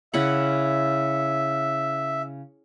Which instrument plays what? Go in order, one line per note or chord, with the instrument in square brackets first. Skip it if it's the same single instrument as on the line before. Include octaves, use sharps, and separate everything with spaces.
[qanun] C#3 E4 F#5 [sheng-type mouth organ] E5